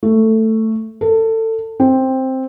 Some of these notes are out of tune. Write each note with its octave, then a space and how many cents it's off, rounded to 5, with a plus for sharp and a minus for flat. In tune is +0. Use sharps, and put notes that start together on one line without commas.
A3 +10
A4 +25
C4 +5